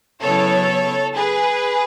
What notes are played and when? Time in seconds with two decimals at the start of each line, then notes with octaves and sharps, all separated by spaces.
0.21 C#3 F#3 B3 E4 A4 C#5
1.15 G#4 B4